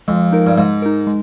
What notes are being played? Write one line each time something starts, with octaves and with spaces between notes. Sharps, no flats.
F2 G#3
D#4 A#4
G2
G#2 G#3
D#4 A#4
G#3